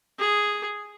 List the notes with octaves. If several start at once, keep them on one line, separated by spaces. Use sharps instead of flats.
G#4